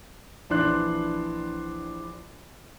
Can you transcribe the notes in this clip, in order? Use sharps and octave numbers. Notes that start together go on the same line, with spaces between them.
A#1 E3 D4 C6 F#6